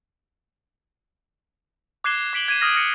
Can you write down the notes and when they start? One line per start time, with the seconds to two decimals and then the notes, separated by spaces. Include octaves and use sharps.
2.04 D6 F#6 G#6 C7 E7 G7
2.33 D6 B6 D7 F#7 G7
2.48 G#6 D#7 E7
2.61 D#6 F6 A#6 D#7
2.75 F6 G#6 A#6 C#7 D#7